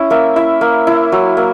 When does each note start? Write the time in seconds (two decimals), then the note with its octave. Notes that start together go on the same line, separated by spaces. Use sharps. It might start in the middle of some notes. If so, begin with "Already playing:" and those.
Already playing: C#4 E4
0.10 A#3 E5
0.36 E4 E5
0.61 A#3
0.87 E4
1.12 F#3
1.37 A#3